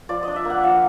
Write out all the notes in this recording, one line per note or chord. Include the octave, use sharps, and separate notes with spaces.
F3 D5
D4 D#5
E5
A#3 F#5
F3 F5